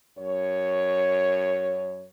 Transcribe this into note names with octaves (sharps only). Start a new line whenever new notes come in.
F#2 C#5